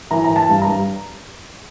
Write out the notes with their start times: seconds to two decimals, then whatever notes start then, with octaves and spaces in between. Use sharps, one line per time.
0.11 E3 A#5
0.24 A#5
0.30 E3
0.36 A5
0.49 G2
0.62 A#5
0.68 G2